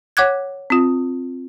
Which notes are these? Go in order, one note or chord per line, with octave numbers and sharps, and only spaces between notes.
C#5 F#5 D6 F#6 G#6
C4 F4